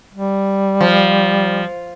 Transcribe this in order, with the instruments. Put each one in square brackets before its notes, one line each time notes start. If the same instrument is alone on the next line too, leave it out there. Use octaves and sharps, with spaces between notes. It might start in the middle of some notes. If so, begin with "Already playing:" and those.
[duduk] G3
[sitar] F3